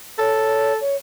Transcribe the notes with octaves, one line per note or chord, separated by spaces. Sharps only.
A4 C#5
C#5